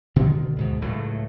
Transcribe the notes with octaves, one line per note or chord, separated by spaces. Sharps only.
B2 D3 D#3
D2 G#2 B2
C#2 A2 F#3 A3